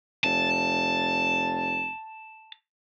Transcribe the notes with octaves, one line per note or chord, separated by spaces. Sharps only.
F1 A5